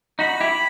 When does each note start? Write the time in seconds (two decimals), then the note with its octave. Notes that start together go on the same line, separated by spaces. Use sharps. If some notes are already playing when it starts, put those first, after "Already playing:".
0.19 D#4 F#4 B5
0.40 E4 G4